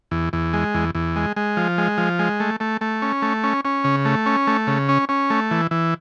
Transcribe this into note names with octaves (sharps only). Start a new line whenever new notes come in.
E2
E2
G#3
E2
E2
G#3
G#3
F3
G#3
F3
G#3
A3
A3
A3
C#4
A3
C#4
C#4
C#3
A3
C#4
A3
C#3
C#4
C#4
A3
E3
E3